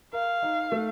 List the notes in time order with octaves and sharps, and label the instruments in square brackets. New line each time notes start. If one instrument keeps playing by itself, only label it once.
[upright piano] A#4 [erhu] F5
[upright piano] D#4
A3